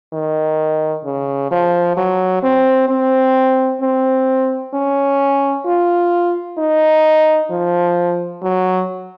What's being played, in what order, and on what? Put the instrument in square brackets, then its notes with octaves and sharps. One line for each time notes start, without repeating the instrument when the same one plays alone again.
[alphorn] D#3
C#3
F3
F#3
C4
C4
C4
C#4
F4
D#4
F3
F#3